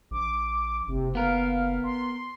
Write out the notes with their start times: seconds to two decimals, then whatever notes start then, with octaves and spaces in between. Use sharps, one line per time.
0.11 A#1 D6
0.88 F#1 C3
1.15 B3 A#4 F5
1.84 C6